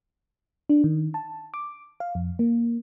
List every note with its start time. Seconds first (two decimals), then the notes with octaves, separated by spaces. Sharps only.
0.69 D4
0.84 D#3
1.14 A5
1.54 D6
2.00 F5
2.15 F2
2.39 A#3